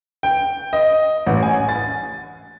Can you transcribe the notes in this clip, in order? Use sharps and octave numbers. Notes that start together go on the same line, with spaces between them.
G5
D#5
A1
G#5
A6